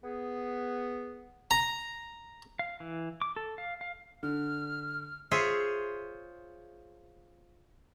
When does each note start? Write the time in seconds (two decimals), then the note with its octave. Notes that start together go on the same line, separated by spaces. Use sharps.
0.02 B3 G#4
1.51 A#5
2.59 F5
2.80 E3
3.22 D6
3.36 A4
3.58 F5
3.81 F5
4.23 D3 F6
5.31 F4 G#4 C5 C#5 E5